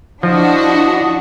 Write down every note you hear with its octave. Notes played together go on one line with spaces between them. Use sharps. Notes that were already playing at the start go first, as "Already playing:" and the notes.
F3 D4 E4 F#4 D#5